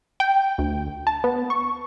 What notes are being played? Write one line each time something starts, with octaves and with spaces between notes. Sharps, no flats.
G5
D2
A5
B3
C#6